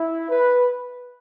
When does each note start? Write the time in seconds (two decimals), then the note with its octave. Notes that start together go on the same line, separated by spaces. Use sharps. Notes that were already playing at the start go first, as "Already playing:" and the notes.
Already playing: E4
0.29 B4